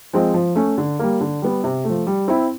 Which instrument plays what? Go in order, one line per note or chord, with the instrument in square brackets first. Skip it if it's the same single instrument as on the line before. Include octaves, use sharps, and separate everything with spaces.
[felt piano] F3 G#3 C4
F3
A3 C#4
D3
G3 A#3
D3
G3 B3
C3
F3 A3
G3
C4 E4